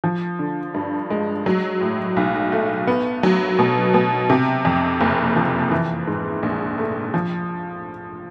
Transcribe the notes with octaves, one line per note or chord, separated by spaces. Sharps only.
F3
D3
G2
G#3
F#3
A2
B1
A3
B3
F#3
B2
B2
C3
F2
F#1
F3
E3
G#2
A#1
A3
F3